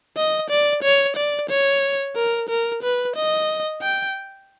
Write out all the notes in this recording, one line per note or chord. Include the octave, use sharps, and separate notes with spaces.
D#5
D5
C#5
D5
C#5
A#4
A#4
B4
D#5
G5